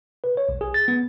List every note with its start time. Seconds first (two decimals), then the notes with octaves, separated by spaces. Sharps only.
0.24 B4
0.37 C#5
0.49 B1
0.61 G#4
0.74 A6
0.88 B3